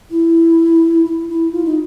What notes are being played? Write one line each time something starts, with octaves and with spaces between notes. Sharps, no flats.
E4
E4
E4
F4
D#4